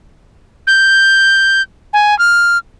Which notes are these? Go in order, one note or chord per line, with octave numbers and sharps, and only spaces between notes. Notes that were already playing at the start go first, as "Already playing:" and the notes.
G6
G#5
F6